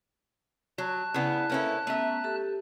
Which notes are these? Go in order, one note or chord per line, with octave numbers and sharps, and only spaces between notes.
F#3 A5 F#6
C#3 B3 E4 D5
A#3 C#4 E4 A4 B4
A3 B3 C#4 E5 A#5
G4 A4